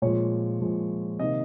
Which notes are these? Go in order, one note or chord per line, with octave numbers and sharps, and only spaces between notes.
A#2 F3 G#3 C#5
A#2 F3 G#3
C3 D#3 A#3 D#5